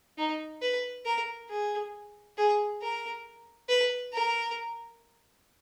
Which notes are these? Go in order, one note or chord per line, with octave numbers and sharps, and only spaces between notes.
D#4
B4
A#4
G#4
G#4
A#4
B4
A#4